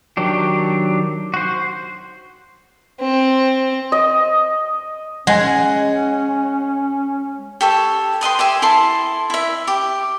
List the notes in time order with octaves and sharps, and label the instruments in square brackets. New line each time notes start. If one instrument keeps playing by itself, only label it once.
[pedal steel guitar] D#3 F#3 D4 G4
F#4 C5
[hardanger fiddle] C4
[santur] D#5
[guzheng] G#3 [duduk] C#4 [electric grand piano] F#5 G#5
[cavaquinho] G4 A4 C#5
B4 D#5 G5 C6
G4 E5 G#5
E4 A4 A5 C6
E4 E5
G4